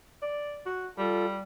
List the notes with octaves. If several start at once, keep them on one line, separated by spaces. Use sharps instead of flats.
D5
F#4
G3 F4 A4